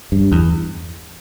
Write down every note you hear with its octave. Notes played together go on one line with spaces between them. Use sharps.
G2
E2